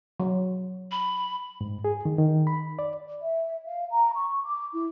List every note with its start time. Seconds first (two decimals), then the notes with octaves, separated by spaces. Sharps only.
0.20 F#3
0.91 B5
1.61 G#2
1.84 G#4
2.05 D#3
2.18 D#3
2.47 B5
2.79 D5
3.22 E5
3.66 F5
3.91 A#5
4.14 C#6
4.44 D6
4.73 E4